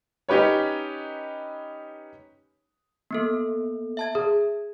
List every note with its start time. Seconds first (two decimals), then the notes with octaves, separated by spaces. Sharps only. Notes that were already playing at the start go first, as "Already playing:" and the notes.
0.29 C#4 D#4 G4 B4 C#5
3.11 A#3 B3 A4
3.97 E5 A5 G#6
4.15 G#4